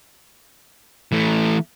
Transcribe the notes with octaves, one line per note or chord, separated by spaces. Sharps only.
E3 A3